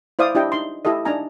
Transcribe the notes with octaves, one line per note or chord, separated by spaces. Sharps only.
E4 C5 D5 F5 D#6
D4 E4 G4 D#5 G5
D#4 C6
E4 G4 A4 D#5
D4 D#4 G#5 A#5